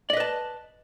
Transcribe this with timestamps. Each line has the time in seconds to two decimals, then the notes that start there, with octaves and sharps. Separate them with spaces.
0.10 D5
0.13 D#5
0.17 B4
0.20 A5